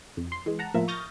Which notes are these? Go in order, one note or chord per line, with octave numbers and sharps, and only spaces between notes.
F2
C6
E3 G#3 G#4
F#5 A5 A#5
A2 F3 A#3 F4 A#4 E5
C#6 D#6 F6 G6 A6 A#6